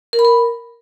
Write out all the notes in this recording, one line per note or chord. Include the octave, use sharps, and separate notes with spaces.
A#4
B5
A#4